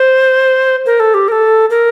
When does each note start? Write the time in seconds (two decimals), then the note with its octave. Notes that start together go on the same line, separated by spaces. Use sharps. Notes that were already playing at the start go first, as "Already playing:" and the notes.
Already playing: C5
0.86 A#4
1.00 A4
1.14 G4
1.28 A#4
1.32 A4
1.70 A#4